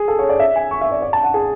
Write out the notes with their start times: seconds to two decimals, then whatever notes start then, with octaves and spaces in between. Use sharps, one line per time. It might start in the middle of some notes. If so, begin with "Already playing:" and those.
Already playing: G#4
0.08 A4
0.19 C#5
0.29 D5
0.40 E5
0.56 G#5
0.71 C#6
0.81 E5
0.92 D5
1.02 D5
1.13 A5
1.23 F#5
1.34 G#4